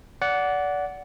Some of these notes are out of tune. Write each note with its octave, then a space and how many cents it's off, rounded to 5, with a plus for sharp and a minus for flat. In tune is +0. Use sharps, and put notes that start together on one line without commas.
D5 -25 F#5 +0